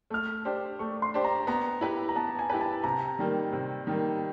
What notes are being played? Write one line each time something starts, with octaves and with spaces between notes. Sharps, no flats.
A3 F6
D4 G4 C5
A3 C#6
C6
D4 G4 C5
A#5
B3 A#5
E4 G4 B4
A#5
B3 A5
G#5
E4 G4 B4
A5
C3 A#5
D#3 G3 A#3
C3
D#3 G3 A#3